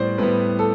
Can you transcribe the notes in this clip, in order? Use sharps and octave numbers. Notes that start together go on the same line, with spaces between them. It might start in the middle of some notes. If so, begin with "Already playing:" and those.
Already playing: A2 G3 B3 C5 D5
A2 G3 B3 B4
A4